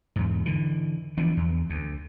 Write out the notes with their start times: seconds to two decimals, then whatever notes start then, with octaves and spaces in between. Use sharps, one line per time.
0.16 E2 G#2
0.46 D3 E3
1.17 E3 F3 B3 D4
1.37 E2
1.70 D2